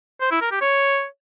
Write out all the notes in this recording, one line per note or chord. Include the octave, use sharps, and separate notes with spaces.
C5
E4
A#4
G4
C#5